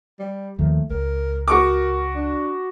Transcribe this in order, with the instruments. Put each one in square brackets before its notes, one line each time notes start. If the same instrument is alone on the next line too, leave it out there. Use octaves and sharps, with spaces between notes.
[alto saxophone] G3
[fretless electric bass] D#2 D#3 F3 [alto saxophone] A3
[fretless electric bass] C#2 [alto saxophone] A#4
[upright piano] F#4 C#6 D6 [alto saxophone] A#4
[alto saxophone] D4